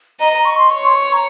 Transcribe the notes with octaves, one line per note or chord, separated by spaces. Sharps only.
D#5 A#5
A#5
C#6
C6
C#5 C#6
C6
C#6
A#5